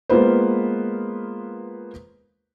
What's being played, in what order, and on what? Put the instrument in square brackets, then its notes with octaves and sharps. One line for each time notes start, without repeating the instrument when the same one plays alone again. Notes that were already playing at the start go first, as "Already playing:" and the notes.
[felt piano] G#3 A#3 B3 F4 B4 C5